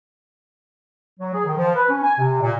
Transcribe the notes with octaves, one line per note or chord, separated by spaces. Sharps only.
F#3
G#4
D#3
F3
B4
C#4
G#5
C3
A#2